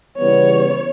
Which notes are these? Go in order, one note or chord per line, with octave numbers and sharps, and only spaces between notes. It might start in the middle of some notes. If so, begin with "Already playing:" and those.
C#3 E3 G3 B3 C#5